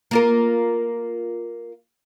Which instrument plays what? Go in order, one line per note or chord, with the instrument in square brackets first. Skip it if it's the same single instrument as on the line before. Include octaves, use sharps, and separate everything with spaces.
[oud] A#3 F4 A#4